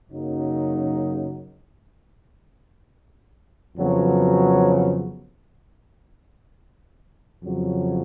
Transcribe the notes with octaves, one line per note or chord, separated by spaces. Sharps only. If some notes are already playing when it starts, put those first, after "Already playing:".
F#2 C#3 F#3 A#3 D#4
F2 C#3 F#3 B3
F2 C#3 F#3